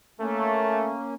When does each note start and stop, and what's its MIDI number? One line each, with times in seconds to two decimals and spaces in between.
0.20 0.92 57
0.20 1.14 58
0.20 1.14 61